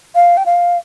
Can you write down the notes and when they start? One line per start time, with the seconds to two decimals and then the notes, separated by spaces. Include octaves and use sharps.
0.15 F5
0.37 G5
0.46 F5